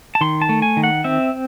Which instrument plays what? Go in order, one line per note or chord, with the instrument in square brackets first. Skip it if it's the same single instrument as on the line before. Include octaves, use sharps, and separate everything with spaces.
[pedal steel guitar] A5
D#3 C6
A5
A3
G#5
D#3
F#5
C4 E5